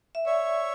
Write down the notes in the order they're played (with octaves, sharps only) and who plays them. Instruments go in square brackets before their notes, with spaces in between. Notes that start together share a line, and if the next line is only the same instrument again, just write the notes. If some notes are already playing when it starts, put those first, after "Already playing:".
[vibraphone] E5
[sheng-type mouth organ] C#5 E5 [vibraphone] D5